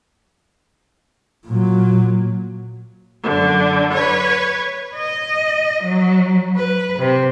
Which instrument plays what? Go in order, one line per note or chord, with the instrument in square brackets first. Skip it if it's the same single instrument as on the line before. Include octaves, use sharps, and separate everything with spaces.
[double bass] A#2 F#3
[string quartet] F#2 D3
B4 C#5
[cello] D#5
F#3
B4
C3